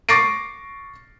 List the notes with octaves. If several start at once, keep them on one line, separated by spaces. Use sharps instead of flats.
C#6 D6 A6 A#6 C7 D7